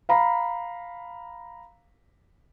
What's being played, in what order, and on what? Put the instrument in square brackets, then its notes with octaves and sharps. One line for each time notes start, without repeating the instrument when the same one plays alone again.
[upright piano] F5 A#5 B5